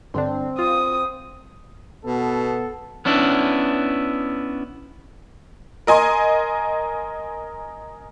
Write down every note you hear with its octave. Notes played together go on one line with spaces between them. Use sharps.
G2 D3 C4 D4
F4 D#6
B2 B3 A4
B3 C#4 D4 E4
A#4 D#5 G#5 C6